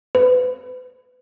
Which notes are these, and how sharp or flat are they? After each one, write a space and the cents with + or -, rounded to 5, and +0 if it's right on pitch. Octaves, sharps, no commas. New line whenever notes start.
B4 +30